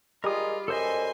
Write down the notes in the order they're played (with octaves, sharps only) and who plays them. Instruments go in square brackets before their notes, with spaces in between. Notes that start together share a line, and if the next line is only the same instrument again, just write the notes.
[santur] G3 [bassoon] G#3 [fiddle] F4 [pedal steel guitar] A#4 D#6
[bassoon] F#2 [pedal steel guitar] A4 C5 D#5 [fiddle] G#5 C6